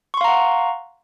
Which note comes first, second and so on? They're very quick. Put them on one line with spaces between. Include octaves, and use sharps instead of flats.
C#6 C6 F5 A#5 F#5